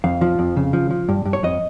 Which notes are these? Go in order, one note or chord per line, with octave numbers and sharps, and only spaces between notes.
F2 F5
F3
F2
C#3
F3
F3
G2
G2
C#5
F2 D#5